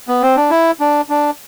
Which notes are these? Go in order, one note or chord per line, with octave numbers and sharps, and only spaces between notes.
B3
C4
D4
E4
D4
D4